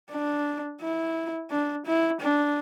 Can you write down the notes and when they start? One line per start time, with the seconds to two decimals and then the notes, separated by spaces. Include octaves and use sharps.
0.11 D4
0.82 E4
1.51 D4
1.86 E4
2.21 D4